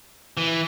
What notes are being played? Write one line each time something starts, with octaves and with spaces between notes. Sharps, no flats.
E3